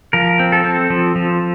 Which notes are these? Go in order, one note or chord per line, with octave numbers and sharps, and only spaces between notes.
F3 A#4
C4
A4
C4
F3
F3